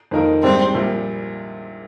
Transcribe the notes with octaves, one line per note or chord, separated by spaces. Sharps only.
F2 D#3 A#3 D#4 A#4
A#1 G#2 G3 C4 D4 G4
A#1 A#2 G3